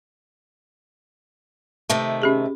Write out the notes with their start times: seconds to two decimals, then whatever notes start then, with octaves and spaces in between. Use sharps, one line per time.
1.90 C3 D#3 A3
2.22 C#4 G4 G#4